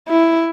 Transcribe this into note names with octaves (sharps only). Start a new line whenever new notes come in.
E4